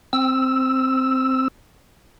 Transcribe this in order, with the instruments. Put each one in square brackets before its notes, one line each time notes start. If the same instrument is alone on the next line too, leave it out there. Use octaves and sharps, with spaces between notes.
[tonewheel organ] C4 E6